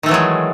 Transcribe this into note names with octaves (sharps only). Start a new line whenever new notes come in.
D#3 E3 F#3 G#3 A3